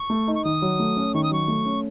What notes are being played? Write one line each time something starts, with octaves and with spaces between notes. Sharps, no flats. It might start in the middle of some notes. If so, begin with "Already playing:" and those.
Already playing: C#6
A3
D#4
C#6
D#3 D#6
F#3
A3
C#4
D#3 C#6
D#6
F#3 C#6
A3
C#4